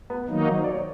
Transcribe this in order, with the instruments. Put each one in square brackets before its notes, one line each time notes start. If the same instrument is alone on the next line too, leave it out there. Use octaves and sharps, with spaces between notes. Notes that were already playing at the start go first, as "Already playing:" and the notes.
[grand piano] B3
[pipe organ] D#3 F#3 A#3 D#4
[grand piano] F#4
C5
D5
C#5